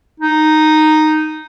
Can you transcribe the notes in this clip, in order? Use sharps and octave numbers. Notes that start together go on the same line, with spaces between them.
D#4